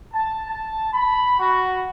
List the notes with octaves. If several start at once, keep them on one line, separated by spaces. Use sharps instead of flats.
A5
A5
B5
F#4